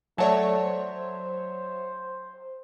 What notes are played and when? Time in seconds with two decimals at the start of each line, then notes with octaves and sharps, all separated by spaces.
0.18 F#3 A3 C#5 D5 E5 F#5 A5
0.63 C5